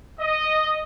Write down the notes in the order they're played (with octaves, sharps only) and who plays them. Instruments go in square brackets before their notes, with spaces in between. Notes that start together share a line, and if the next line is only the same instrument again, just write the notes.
[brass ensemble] D#5